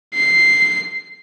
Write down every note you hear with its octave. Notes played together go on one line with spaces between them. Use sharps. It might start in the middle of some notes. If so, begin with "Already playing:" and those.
C7